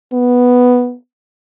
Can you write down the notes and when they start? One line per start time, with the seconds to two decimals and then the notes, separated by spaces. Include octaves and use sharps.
0.12 B3